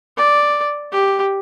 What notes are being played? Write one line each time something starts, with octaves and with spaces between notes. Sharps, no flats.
D5
G4